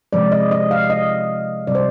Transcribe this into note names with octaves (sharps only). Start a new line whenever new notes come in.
C3 F3 G#3 D5
D#5
D#5
F5
D#5
C3 G3 D5
C5